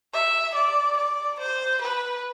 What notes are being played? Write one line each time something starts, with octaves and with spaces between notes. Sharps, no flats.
E5
D5
D5
C5
B4